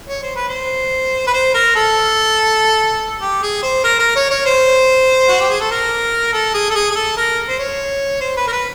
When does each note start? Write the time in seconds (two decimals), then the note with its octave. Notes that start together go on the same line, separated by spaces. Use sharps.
0.08 C#5
0.23 C5
0.36 B4
0.49 C5
1.27 B4
1.34 C5
1.54 A#4
1.76 A4
3.21 G4
3.42 G#4
3.62 C5
3.84 A#4
3.99 A#4
4.15 C#5
4.30 C#5
4.46 C5
5.28 F#4
5.40 G4
5.50 G#4
5.61 A4
5.71 A#4
6.33 A4
6.54 G#4
6.70 A4
6.75 G#4
6.91 G#4
6.96 A4
7.17 A#4
7.49 C5
7.59 C#5
8.21 C5
8.37 B4
8.47 A#4
8.52 B4